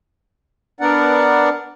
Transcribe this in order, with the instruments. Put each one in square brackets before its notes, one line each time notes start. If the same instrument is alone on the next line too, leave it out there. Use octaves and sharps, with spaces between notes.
[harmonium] B3 D4 A#4 D5 F#5